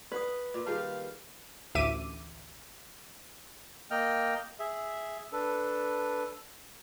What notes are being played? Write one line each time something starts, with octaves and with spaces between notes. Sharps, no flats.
B4 D5 F#5 D#6
A#2 D5
A#2 D#3 G3 G#4 F5 A5
A1 D2 E5 D6 D#7
A#3 D#5 G5 F6
G#4 E5
D4 A4 B4